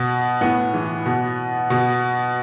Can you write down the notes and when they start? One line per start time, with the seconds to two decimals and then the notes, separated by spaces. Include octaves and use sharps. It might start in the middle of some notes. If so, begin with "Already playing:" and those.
Already playing: B2
0.41 A2 B3
0.74 E3
1.06 B2
1.70 B2